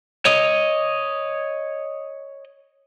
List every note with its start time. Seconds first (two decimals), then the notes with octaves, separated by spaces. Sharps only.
0.25 C#5 D#5